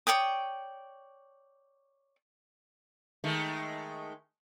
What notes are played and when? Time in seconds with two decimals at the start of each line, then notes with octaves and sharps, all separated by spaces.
0.07 C#5 D5 G5 D#6
3.24 D#3 G#3 A3